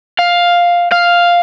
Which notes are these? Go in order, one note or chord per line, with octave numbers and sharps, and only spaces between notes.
F5
F5